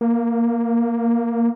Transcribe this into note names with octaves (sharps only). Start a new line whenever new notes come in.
A#3